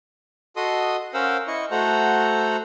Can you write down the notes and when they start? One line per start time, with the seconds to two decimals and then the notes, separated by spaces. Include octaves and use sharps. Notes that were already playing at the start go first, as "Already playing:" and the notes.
0.56 F#4 A4 D#5 C6 D#6
1.14 C#4 A#4 C5 F5 F#5 E6
1.47 E4 D#5 C#6
1.71 A3 F#4 A4 C5 F#5 A#5